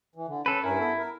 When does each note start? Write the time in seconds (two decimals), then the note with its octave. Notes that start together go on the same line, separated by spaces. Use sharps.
0.15 E3
0.28 D3
0.46 C#4 A4 B4
0.64 G2 C#4 E4 A#4
0.80 B3 A4
0.98 A#4